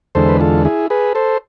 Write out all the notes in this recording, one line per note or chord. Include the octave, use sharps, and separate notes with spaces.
E2 D3 G#3 A4 C5
B4
F4 A4
E4 G#4
G#4 B4
A4 C5